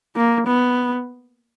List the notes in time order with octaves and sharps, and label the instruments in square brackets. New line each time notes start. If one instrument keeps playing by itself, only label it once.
[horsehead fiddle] A#3
B3